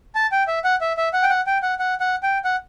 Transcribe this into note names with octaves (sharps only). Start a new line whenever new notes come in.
A5
G5
E5
F#5
E5
E5
F#5
G5
F#5
G5
F#5
F#5
F#5
G5
F#5